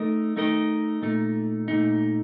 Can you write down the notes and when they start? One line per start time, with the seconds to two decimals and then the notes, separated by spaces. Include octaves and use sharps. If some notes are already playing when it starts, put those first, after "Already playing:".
Already playing: A3 D#4 A#4 D#5
0.37 A3 D#4 A#4 D#5
1.02 A#2 A3 D#4
1.68 A#2 A3 D#4